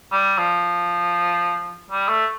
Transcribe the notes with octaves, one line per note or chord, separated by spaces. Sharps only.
G3
F3
G3
A3